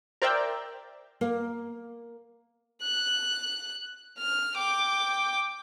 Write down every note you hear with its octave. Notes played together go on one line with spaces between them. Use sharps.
A#4 C5 D5 E5 G5
A#3
F#6
F6
G5 D6